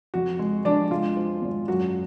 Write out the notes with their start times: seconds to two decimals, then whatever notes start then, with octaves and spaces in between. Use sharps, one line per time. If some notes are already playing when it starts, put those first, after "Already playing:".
0.14 F2 F#4
0.39 G#3
0.65 F2 D4 D5
0.91 G#3 F4
1.17 F3
1.42 G#1
1.68 F#2 F#4